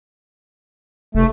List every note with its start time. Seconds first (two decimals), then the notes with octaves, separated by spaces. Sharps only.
1.15 F1 A3